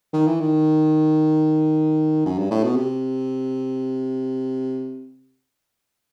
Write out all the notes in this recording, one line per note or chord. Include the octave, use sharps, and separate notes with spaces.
D#3
E3
D#3
F#2
G2
A2
B2
C3